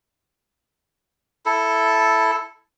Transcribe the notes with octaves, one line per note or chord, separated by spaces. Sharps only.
E4 A4